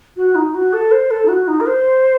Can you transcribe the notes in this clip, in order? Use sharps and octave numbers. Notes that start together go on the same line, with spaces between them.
F#4
D#4
F#4
A4
C5
A4
D#4
F#4
D#4
A#4
C5